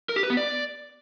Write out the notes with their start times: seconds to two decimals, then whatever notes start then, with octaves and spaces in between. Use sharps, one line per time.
0.09 A#4
0.16 G4
0.23 B4
0.30 B3
0.37 D5